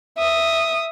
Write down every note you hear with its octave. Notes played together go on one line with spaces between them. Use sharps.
E5 D#6